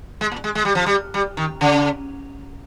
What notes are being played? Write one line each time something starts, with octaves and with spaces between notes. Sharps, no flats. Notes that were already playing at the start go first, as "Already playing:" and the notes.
G#3
A#2
G#3
G#3
G3
F3
G3
G3
D#3
C#3